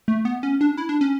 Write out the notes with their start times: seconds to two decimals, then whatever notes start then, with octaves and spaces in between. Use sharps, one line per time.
0.08 A3
0.25 B3
0.43 C#4
0.61 D4
0.77 E4
0.89 D4
1.01 C#4